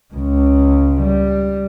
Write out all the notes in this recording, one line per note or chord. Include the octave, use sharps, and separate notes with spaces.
C#2 C#3
G3